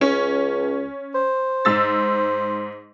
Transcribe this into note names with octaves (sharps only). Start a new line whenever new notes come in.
C#2 C#4
C5
G#2 E6 A6